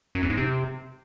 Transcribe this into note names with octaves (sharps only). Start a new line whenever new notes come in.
F#2
E2
G#2
C3